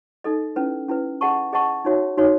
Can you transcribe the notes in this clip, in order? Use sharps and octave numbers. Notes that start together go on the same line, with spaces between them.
D#4 A4 D#5
C#4 E4 B4
C#4 E4 B4
G#4 D#5 F#5 A5 C#6
G#4 D#5 F#5 A5 C#6
D#4 F#4 C#5 E5
D#4 F#4 C#5 E5